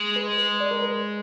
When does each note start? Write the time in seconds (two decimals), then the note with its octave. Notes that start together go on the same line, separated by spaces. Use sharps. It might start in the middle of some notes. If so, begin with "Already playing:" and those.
Already playing: G#3
0.16 B4
0.38 B4
0.60 D5
0.71 A#4
0.82 B4